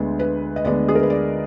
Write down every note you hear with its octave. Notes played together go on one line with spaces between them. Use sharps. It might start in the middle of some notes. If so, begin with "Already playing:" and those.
Already playing: D2 D3 G#3 B3
B4
D#5
D2 D3 G#3 B3 D5
G#4
A#4
B4
D5